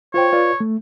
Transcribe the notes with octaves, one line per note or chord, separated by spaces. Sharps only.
F4 C5 C#5 G5
F4 B4 D5
A3